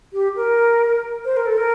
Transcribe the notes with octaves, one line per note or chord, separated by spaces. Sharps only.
G4
A#4
C5
A#4
A4
A#4